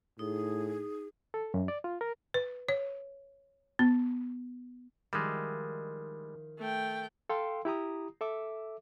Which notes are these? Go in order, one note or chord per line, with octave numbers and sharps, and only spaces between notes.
A2 D#4 G#4
A4
F#2
D5
F4
A#4
B4
C#5
B3
D#3 F3 G3 G#3 E4
A3 G5
A4 F5 G5 C6
E4 G4 A#5 D#6
A4 E5 D6